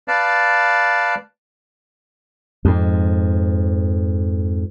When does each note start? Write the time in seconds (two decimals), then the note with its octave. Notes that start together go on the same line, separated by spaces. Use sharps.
0.08 B4 D5 F5 A5
2.65 F2 G#2